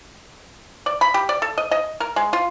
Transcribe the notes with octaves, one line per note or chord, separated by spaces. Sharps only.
D5
B5
G4
D5
A4
D#5
D#5
A#4
G#3
F4